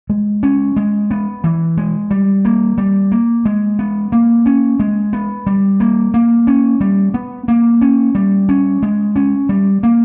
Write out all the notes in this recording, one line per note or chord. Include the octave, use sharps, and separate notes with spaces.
G#3
C#4
G#3
B3
E3
G#3
G3
A#3
G3
A#3
G#3
B3
A#3
C#4
G#3
B3
G3
A#3
A#3
C#4
G3
B3
A#3
C#4
G3
C#4
G#3
C#4
G3
A#3